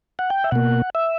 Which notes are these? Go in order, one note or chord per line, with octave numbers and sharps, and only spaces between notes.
F#5
G5
E5
B2 A#3 F#5
E5